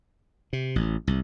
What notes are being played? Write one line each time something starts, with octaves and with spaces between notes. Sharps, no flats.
C3
A1
C2